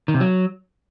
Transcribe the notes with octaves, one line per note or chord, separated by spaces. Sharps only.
D#3
C3
F#3